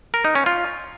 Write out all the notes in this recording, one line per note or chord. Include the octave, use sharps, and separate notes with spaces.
A#4
D#4
C#4
F4